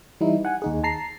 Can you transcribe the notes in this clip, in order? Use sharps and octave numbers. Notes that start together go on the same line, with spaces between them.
E3 G3 D#4 E4
F#5 G#5
D#2 D#4 G#4
A5 A#5 C7